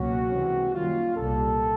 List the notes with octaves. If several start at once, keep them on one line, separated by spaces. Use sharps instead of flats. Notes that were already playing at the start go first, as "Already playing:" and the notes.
Already playing: C#2 B2 F#3 A#3 C#4 F#4
C3 E3 G#3
F#2 D#3 G3 A#3 C#4 F4
C2 A#2 G3 A#3 A4